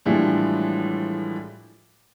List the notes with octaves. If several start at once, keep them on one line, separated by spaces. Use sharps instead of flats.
A2 E3 F3 G3 G#3 D4